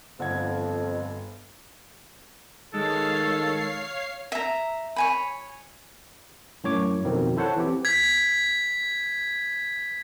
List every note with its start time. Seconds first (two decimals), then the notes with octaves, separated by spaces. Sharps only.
0.19 G1 F2 F#5 G#6
2.74 D#3 G#3 A4 C#5 F5 C7
4.32 E5 A#5
4.96 C#5 G#5 B5
6.64 F#2 A2 C#5 D6
7.04 F2 B2 D#3 F3 C4
7.37 E4 A4 C5 C#5 F#5 A5
7.56 E3 C4 G4
7.85 G#6 B6